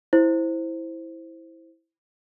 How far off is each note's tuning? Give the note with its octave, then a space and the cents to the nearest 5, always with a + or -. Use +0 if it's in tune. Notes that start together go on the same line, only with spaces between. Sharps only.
E4 -5 C5 +0